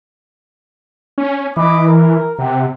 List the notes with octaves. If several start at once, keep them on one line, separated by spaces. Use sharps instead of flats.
C#4
E3 D#5 B5 D6
A#4
C3 G4 F#5